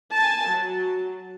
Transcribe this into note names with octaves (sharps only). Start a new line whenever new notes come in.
G#5 A5
F#3